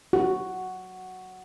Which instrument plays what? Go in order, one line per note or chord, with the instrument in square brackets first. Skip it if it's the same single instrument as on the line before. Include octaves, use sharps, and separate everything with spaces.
[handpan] F#4